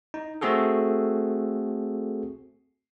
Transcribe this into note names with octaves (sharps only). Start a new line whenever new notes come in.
D#4
A3 C4 F#4 G#4 A4